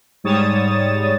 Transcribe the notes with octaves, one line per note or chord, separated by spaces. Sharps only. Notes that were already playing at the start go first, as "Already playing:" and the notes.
G#2 G3 C#5 D#6 A6 E7